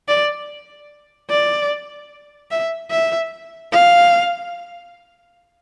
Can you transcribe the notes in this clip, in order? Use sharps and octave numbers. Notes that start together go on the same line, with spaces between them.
D5
D5
E5
E5
F5